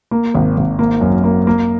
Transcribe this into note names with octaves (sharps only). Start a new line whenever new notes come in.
A#3
G#1
G#1
A#3
F#2
A#3
A#3